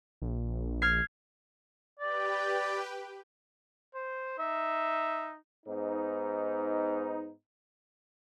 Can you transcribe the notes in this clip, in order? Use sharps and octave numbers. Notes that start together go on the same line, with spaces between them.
A#1
F6 G#6 C7
G4 B4 D5 G5
C5
D#4 E5
G#2 B3 D#4